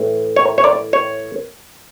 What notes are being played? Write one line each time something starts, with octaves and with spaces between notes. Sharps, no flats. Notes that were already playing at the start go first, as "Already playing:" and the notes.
Already playing: A2 E3
C#5
C#5
D5
C#5